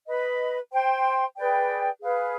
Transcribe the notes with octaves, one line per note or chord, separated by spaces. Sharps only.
B4 D#5 B5
C5 G5 C6
G#4 B4 D5 G5
G#4 B4 F5